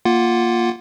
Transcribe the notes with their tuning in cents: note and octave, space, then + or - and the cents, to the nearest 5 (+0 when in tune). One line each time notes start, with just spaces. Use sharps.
A#3 +0 F4 +0 F#5 +0